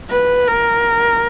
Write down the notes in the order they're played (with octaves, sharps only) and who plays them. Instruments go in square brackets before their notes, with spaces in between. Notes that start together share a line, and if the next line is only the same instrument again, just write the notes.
[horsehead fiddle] B4
A#4